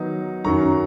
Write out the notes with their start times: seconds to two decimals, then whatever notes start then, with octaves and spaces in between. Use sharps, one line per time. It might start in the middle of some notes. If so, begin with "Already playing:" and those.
Already playing: D#3 F#3 B3 D#4
0.45 F#2 D#3 F#3 A#5 C#6